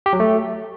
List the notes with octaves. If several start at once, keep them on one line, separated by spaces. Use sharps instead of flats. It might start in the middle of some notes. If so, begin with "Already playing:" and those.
G4
F#3
A3